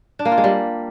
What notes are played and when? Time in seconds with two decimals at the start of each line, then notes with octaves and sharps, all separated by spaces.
0.19 D4
0.25 A#3
0.32 F4
0.38 G#3
0.44 G3